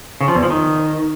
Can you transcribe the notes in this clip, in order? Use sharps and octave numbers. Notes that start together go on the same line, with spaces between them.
C#3
F3
E2
F3
D#3